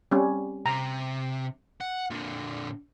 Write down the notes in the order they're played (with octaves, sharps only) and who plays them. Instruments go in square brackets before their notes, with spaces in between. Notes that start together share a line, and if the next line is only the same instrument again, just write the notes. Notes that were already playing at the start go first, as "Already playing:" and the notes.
[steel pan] G3 C4 C#4
[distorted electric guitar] C3 [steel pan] A#5
[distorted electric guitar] F#5
A#2 D3